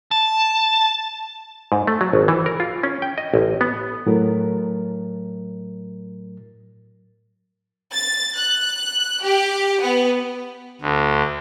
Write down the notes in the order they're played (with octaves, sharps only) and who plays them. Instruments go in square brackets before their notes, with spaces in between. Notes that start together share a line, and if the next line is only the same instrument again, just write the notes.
[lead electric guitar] A5
[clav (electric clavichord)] G#2
A3
F#3
G#1
E3
A#4
F4
C#4
G5
D#5
A1
B3
[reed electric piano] A2 F#3 A#4
[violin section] A6
F#6
G4
B3
[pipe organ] D2